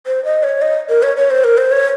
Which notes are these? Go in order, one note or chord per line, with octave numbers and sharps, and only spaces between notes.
C5
D#5
C#5
D#5
A#4
C#5
C#5
C5
A#4
C5
C#5